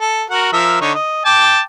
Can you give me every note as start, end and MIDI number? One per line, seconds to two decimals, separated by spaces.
0.01 0.23 69
0.30 0.52 66
0.30 0.52 70
0.30 0.52 78
0.53 0.76 53
0.53 0.76 70
0.53 0.76 76
0.81 0.93 50
0.81 0.93 63
0.81 0.93 73
0.95 1.22 75
1.25 1.60 79
1.25 1.60 81
1.25 1.60 86